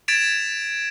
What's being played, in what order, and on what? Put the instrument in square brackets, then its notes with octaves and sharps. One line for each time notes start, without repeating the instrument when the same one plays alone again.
[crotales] G#6 A6 B6 D7 E7 F7